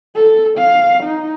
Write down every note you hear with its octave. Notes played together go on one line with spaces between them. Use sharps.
A4
F5
D#4